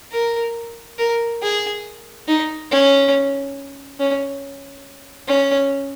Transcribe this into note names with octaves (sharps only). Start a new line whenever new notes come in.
A#4
A#4
G#4
D#4
C#4
C#4
C#4